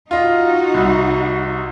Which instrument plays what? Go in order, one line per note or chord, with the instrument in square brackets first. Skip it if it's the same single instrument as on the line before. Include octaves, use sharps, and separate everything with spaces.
[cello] D#4 F#4 [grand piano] F4 D#5
[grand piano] C2